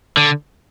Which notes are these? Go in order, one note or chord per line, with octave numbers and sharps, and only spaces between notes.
D3